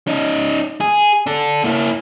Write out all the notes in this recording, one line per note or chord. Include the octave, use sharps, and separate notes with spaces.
C#4 D#4
G#4
D4 A4
A#3 E4